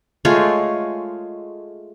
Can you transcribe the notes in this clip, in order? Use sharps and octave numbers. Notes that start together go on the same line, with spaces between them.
G#3 A3 F4 C#5